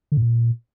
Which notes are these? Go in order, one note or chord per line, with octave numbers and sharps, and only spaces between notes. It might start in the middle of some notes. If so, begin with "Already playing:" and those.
D3
A2
A#2